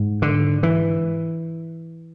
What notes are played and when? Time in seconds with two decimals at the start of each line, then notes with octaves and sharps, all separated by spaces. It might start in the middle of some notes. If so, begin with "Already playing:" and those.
Already playing: G#2
0.22 D3
0.63 E3